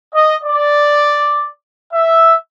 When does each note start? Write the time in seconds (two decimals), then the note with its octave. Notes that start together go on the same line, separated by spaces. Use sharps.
0.14 D#5
0.44 D5
1.92 E5